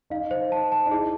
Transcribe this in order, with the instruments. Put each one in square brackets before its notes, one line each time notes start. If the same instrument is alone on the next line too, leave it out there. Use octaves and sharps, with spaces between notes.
[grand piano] D#4 [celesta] F5
[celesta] C5
A5
A5
[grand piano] D#4
[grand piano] E4 [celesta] G#4